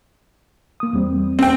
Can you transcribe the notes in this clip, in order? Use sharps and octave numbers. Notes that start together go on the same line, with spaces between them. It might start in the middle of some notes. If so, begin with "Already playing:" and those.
A#3 D#6
E2 G3 C4
C4 G5